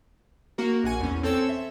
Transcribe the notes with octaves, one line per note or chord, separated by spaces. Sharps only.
A#3 F#4 A#4
A#1 F#5 G#5
E2 C#4
C4 A4 C#5 E6 E7
E5